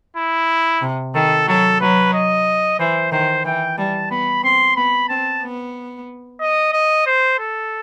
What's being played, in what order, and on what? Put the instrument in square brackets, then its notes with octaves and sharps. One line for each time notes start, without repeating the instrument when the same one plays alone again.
[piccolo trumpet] E4
[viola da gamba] C3
[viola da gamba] D#3 [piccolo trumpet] A4
[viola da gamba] F#3 [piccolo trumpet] A4
[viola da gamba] F#3 [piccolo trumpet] B4
[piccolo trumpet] D#5
[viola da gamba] E3 [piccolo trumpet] C5
[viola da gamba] D#3 [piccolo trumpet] C5
[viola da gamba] E3 [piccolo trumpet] G5
[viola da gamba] G3 [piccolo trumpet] A5
[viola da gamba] B3 [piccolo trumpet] B5
[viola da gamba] C4 [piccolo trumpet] C6
[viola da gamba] B3 [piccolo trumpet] B5
[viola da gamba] C4 [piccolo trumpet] A5
[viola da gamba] B3
[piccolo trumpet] D#5
D#5
C5
A4